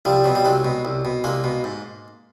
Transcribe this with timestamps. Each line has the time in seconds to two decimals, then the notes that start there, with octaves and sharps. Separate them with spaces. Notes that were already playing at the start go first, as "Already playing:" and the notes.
0.05 C2 F3 G3
0.24 B2 F#3
0.35 G3
0.45 C2 F#3 G#3
0.65 B2
0.85 C2
1.05 B2
1.24 C2 G#3 A#3
1.44 B2
1.64 G#2